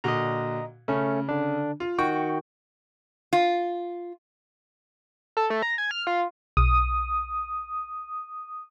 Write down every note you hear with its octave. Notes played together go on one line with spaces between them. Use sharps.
A#2 D3 F#4 D#5 A#5
C#3 A3 C#4
D3 D4
F4
D#3 F#4 G5 C#6
F4
A4
A3
A#5
G#5
F6
F4
B1 D#6